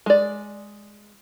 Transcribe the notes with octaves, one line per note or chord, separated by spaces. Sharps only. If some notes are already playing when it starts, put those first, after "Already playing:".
G#3 D5